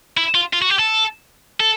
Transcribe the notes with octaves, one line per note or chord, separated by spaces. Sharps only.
E4
F4
F4
F#4
G4
A4
A4